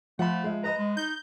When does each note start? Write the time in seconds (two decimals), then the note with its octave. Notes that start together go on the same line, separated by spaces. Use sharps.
0.19 F3 A3 F#5 B5
0.44 G#3 E5
0.64 B4 D#5 A#5 B5
0.78 G#3
0.97 D#4 G6